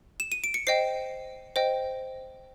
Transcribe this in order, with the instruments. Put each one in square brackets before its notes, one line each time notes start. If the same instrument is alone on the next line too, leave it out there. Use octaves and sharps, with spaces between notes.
[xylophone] E7
D#7
D7
C#7
C5 D#5 G5 C7
C5 D#5 G5